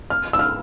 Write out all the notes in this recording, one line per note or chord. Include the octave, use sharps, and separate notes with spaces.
F6
E6
F6